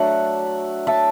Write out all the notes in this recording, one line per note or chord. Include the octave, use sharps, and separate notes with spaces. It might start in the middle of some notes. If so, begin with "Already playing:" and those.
Already playing: F#3 A3 D4 E5 F#5
E5 A5